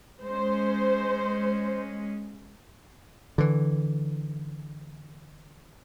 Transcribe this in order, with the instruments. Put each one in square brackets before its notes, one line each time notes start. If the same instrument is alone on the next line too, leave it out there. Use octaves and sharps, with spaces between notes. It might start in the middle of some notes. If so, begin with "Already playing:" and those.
[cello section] G#3 C#4 [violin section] C5
[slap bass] D3 E3